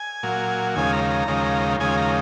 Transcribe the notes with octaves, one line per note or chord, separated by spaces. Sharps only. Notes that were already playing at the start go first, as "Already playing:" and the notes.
Already playing: G#5
A#2 F#3
D#2 C#3 F3 G#3 G#5
A#5
A#5
D#2 C#3 F3 G#3
D#2 C#3 F3 G#3 G#5
A#5